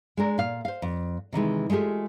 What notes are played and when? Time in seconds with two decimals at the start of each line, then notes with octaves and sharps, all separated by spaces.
0.17 G#3 D4 A#4
0.38 A#2 F5
0.65 C5 F5
0.82 F2
1.33 C3 D#3 E3 G#3
1.70 G#3 A3 F4 G4 G#4